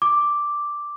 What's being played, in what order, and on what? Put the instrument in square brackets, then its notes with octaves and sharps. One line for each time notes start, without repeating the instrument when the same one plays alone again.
[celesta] D6